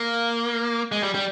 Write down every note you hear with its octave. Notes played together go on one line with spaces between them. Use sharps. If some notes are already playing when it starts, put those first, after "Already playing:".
Already playing: A#3
G#3
G3
G3